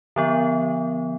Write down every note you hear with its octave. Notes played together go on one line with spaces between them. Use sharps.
D3 F3 B3